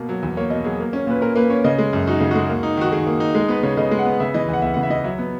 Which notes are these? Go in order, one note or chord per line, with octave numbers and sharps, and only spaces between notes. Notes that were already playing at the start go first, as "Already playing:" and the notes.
Already playing: B2 A#3
F#3
E2
A#3 C#5
B2 D#5
F#3 G#4
A#3
C#4
A#2 B4
A#2 A#4
A#3 B4
C#4 C#5
C#3 D#5
G#3
F#2
D#4 F#4
C#3
G#3 F#4
A#3
D#4
D#3 F#4
D#3 G#4
A#3
D#4
G#3
B3 B4
C#3 C#5
C#3 D#5
G#3
F#5
B3
C#3 E5
E3 D#5
E2 F#5
E2 E5
C#3 F#5
E5
E3 D#5
F#3 E5
B3